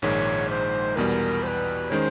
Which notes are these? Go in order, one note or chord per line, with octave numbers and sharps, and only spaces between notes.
A#1 G#2 D#3 G#3 C#5
C5
E2 B2 G3 A#4
C5
B4
D#3 G#3 C#4 C5 C#5